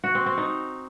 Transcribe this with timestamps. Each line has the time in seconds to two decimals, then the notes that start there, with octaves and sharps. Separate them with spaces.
0.04 F#4
0.15 C4
0.26 C4
0.38 D#4